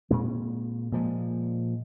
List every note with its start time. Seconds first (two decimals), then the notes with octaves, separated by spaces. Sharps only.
0.10 A#2 G#3 C4
0.92 A#2 F3 G#3